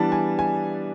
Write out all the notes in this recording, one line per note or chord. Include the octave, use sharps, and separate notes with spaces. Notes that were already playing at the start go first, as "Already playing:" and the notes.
Already playing: E3 G3 B3 D4 A5
G#5
G#5